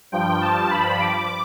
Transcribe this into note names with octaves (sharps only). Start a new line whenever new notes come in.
G2 F3 G5
A5
B5
D6